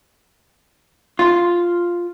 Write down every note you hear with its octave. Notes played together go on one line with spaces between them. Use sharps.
F4